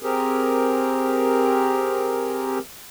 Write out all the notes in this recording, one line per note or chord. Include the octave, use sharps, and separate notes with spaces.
C4 G4 G#4 A#4